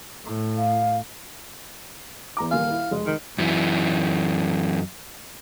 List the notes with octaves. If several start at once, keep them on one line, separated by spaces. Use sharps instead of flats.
A2
F5
E2 A#5 D6
D#1 A#3 F5 G#5
E4
F1 G#3 D#5
D#3
F#2 E3